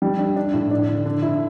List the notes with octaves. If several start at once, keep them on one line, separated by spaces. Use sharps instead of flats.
G3
D4
D4
A2
D4
D3
D3
E4